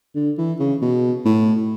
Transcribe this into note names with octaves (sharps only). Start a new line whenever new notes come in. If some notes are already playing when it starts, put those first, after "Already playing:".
D3
E3
C#3
B2
A2